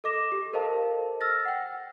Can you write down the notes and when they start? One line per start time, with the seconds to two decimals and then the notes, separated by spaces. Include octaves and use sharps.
0.04 A4 D#5 D6 A#6 E7
0.32 G4
0.53 A4 A#4 C5 D#5 F5 A5
1.20 E6 F6 A6 A#6
1.45 F#5 G5